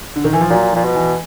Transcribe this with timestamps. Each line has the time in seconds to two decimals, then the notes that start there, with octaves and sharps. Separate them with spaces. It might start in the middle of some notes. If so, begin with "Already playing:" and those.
0.16 D3
0.24 D#3
0.33 E3
0.41 F3
0.50 A#2 F#3
0.73 A#2 F3
0.84 B2
0.95 E3